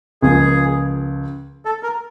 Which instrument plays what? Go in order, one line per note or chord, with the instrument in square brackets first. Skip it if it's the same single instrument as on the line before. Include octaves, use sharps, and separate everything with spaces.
[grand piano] C#2 C#3 F3 A#3 [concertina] G#4
[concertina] A4
A#4